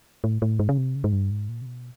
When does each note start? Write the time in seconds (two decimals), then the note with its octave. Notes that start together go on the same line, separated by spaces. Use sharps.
0.24 A2
0.42 A2
0.59 G#2
0.69 C#3
0.78 C3
0.95 C#3
1.04 G#2
1.13 G2
1.31 G#2
1.49 A#2
1.61 C3
1.66 B2